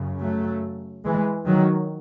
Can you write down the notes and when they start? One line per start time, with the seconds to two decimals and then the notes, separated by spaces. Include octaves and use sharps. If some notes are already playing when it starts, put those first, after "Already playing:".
Already playing: F#2 C#3
0.22 F#3 A3
1.05 E3 G#3
1.46 D#3 F#3